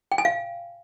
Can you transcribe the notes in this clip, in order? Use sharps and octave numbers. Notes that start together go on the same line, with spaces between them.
G5
G#5
F5